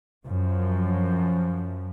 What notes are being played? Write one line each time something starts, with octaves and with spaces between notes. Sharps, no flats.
F#2 F3